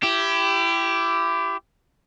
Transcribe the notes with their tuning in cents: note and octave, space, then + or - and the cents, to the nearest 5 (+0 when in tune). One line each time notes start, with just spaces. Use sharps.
E4 +30 G4 -5